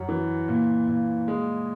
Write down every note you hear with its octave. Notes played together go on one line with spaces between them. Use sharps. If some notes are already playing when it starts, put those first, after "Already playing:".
Already playing: F#2
E3
A#2
A#2
G#3